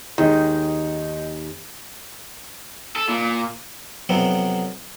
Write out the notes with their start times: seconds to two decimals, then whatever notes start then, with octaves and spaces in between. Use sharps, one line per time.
0.18 D#2 D#3 G#3 D#4
2.96 A4
3.09 A#2
4.09 F2 C3 F#3 B3 C4